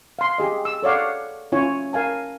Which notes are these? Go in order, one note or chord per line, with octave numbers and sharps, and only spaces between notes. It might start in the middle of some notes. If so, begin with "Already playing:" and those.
F5 C6
G4 G#4 D#5
E6
A4 C#5 D5 F5 F#5
C#4 E4 F4 C#5 G#5
A#4 F5 G#5 A5